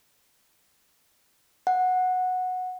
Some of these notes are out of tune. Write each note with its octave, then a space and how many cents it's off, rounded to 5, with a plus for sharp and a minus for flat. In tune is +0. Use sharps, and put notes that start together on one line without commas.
F#5 -10